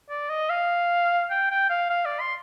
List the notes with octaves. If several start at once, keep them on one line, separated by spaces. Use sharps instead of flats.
D5
D#5
F5
G5
G5
F5
F5
D5
C6